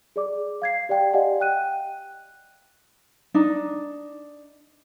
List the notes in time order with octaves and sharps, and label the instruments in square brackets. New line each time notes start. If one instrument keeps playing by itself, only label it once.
[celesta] G#4 D5 D6
F5 G#6 C7
G4 D5 F5 G5
G4 D5 D#5 F5 F#5 G#5
G5 F#6 D#7
[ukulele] D4 D#4